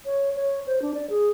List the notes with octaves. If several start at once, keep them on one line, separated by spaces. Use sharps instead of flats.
C#5
C#5
C5
D4
D5
G#4